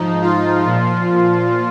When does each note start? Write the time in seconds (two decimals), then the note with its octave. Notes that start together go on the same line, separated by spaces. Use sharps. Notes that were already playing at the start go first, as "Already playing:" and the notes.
Already playing: G#2 F3 D#4
0.21 F4
0.64 A#2 F3